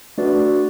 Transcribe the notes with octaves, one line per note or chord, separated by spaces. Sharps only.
A3 D4 F#4 B4 D5